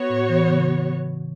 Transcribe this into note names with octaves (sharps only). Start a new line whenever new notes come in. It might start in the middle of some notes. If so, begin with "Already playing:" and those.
Already playing: B3 F#4 C#5
A2
E3
C#3